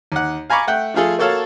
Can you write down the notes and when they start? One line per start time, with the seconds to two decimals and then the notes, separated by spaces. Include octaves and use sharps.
0.12 D#2 F#5
0.50 F5 G#5 A#5 B5 C#6 D6
0.67 A3 F#5 G5
0.94 F3 A3 F4 G#4 A4
1.19 A#3 F#4 A4 C#5 F5 A5